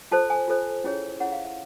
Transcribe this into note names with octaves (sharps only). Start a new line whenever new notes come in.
F4 A4 C5 A5
G#5
F4 A4 C5
C#4 E4 G#4 C#5
C#4 E4 G#4 C#5 F#5
F5
E5